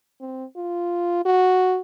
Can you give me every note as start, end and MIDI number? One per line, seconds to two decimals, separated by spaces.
0.21 0.44 60
0.57 1.22 65
1.25 1.80 66